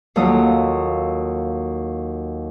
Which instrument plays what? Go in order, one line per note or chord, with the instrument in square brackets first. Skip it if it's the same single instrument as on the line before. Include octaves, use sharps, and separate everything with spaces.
[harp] D#2 F#3 F4 A4 D#6